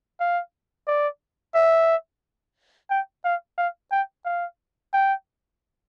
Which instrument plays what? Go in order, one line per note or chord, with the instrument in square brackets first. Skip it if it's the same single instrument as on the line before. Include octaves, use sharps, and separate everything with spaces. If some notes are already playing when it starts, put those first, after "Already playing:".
[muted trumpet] F5
D5
E5
G5
F5
F5
G5
F5
G5